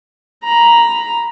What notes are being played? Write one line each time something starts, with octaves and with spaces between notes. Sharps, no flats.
A#5 B5